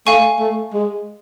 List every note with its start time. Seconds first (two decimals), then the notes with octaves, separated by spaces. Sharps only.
0.07 A3 F5 G#5 C#6
0.40 A3
0.74 G#3